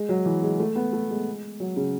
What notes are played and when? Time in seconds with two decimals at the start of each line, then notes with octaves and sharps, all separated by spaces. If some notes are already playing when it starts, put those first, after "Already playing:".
Already playing: G#3
0.09 F#3
0.26 E3
0.43 G#3
0.60 A3
0.75 B3
0.93 A3
1.10 G#3
1.60 F#3
1.76 C#3